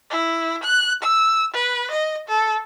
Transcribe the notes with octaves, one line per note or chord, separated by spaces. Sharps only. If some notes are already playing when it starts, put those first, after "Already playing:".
E4
F#6
E6
B4
D#5
A4